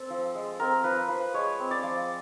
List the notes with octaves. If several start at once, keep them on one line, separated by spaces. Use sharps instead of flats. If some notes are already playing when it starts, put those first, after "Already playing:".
Already playing: C4 A4
F3
G#3
C4 A#4
F3 B4
F3 B4
G#3 C#5
C4
D5
F3